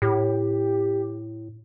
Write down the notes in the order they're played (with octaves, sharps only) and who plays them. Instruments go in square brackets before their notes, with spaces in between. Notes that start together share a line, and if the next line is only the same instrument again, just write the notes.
[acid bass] A2 [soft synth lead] G4